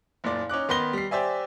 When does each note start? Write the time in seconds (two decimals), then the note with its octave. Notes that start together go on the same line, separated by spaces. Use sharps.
0.24 F#1 A#2 D5
0.49 C#4 D#4 D6 F#6
0.69 D#3 B3 B4 C6 A#6 G7
0.93 G3 C7
1.11 G4 C5 D5 E5 G#5